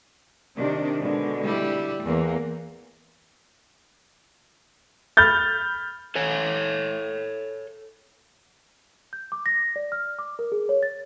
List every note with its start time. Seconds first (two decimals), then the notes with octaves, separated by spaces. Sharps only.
0.55 C3 D#3 D4
0.99 B2 D3 G#3
1.44 G3 E4 G4
2.04 E2 A#3
5.17 B5 F6 G6 A6
6.15 A4 C#5 G#5
9.13 G6
9.32 D6
9.46 A#6
9.76 D5
9.92 F6
10.19 D6
10.39 A#4
10.52 G#4
10.69 C#5
10.83 A6